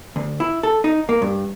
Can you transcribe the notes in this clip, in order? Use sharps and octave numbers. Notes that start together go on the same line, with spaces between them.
D2
E4
A4
D#4
A#3
G2